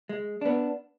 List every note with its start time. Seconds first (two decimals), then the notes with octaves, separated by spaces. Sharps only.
0.09 G#3
0.41 B3 D4